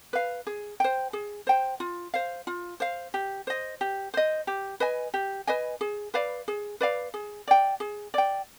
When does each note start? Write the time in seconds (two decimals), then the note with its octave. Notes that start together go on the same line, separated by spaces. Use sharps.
0.13 B4 F5
0.47 G#4
0.80 C5 G5
1.13 G#4
1.47 C5 G5
1.80 F4
2.14 C5 F5
2.47 F4
2.80 C5 F5
3.14 G4
3.47 C5 D#5
3.81 G4
4.14 C5 D#5
4.47 G4
4.80 B4 D#5 G#5
5.14 G4
5.47 B4 D#5 G#5
5.81 G#4
6.14 B4 D5 F5
6.48 G#4
6.81 B4 D5 F5
7.14 G#4
7.48 D5 G5
7.80 G#4
8.14 D5 G5